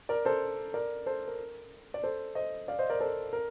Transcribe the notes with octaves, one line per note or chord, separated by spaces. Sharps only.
A#4 D5
A4 C5
A#4 D5
A4 C5
A#4
D5
A4 C5
C5 D#5
D5 F5
C5 D#5
A#4 D5
A4 C5
A#4